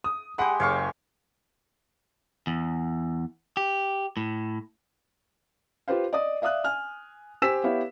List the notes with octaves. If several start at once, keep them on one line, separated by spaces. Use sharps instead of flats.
D#6
G#3 G4 F#5 B5
F#1 C#5 F5 C#6
E2
G4
A2
F4 G4 B4 C5 F5
D5 D#5 D#6
D5 E5 F5 D#6 F#6
G#5 F6
G4 C5 G#5 E6 B6 E7
B3 E4 G4 C#5 F5